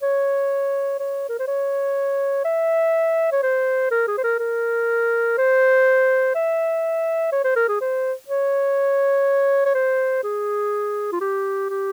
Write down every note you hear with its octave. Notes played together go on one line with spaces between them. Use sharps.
C#5
C#5
A#4
C5
C#5
E5
C#5
C5
A#4
G#4
C5
A#4
A#4
C5
E5
C#5
C5
A#4
G#4
C5
C#5
C#5
C5
G#4
F4
G4
G4